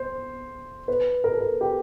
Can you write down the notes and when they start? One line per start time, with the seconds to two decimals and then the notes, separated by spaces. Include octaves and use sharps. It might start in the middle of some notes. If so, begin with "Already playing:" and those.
Already playing: C5
0.88 B4
1.24 A#4
1.32 A4
1.41 A#4
1.61 G4